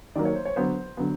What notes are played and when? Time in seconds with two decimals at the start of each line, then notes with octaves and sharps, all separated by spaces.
0.15 D#3 F#3 A#3 D5
0.25 C#5
0.35 C5
0.45 C#5
0.56 D3 F#3 B3 C5
0.97 D3 F#3 B3